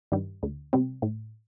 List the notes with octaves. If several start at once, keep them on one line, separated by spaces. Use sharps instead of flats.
G2 D#3 G3
D2
C3 G3 C4
A2